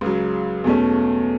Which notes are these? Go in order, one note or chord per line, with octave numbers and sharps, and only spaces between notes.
C#2 C#3 F#3
E2 B2 A3 C#4